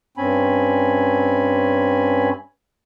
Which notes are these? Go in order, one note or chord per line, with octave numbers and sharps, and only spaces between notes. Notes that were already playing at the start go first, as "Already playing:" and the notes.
G2 C4 C#4 G#5 B5